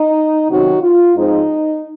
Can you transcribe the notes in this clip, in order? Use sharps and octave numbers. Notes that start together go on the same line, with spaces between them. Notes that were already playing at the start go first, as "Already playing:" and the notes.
Already playing: D#4
C3 D#3 F#3 C#4 D#4 F#4
F4
G#2 F3 C4 D#4